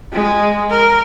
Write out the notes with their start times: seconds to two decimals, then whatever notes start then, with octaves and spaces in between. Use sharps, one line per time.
0.13 G#3
0.71 A#4